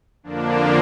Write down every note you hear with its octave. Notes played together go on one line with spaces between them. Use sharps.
F2 D3 F3 A#3 D4